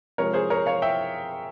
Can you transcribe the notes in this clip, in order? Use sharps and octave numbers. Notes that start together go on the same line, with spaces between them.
C3 F3 G#3 A#4 C#5
G#4 C5
A#4 C#5
C#5 F5
E5 G5